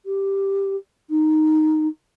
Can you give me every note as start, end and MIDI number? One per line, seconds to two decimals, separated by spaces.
0.06 0.76 67
1.10 1.88 63